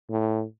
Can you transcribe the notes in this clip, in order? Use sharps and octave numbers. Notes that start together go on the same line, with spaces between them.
A2